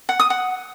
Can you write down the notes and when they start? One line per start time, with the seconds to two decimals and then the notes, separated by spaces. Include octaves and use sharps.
0.09 F#5
0.20 D#6
0.30 F#5